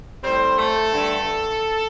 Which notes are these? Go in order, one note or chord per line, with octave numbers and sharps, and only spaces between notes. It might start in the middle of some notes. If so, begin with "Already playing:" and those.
A2 G3 C4 C5
A3 A4
G2 D3 A3